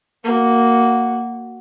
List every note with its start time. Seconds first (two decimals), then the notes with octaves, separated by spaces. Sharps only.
0.24 A#3 F#4